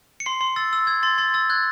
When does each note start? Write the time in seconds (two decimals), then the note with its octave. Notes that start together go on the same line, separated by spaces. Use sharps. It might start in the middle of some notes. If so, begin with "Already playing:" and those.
0.20 C#7
0.26 C6 C7
0.41 C6
0.56 E6 A6
0.73 E6
0.87 E6 G#6
1.03 C6 A6
1.18 C6 A6
1.34 E6 A6
1.50 F#6 G#6